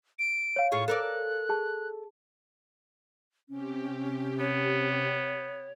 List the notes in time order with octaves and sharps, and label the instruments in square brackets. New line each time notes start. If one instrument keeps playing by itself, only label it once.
[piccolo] D7
[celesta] C#5 F5
[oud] A2 F4 G#4 [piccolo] C#6
[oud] A4 A#4 D5 [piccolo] F#6
[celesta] G#4 A5
[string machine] C3 G4 [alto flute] C#4
[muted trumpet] B3 [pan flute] C#5